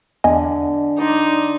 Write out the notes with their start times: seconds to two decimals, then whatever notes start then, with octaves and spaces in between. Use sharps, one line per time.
0.24 E2 D3 D#5 G#5
0.98 D#4 D5 C6